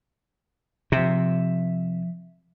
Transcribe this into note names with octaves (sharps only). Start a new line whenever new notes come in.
C3 F3 E5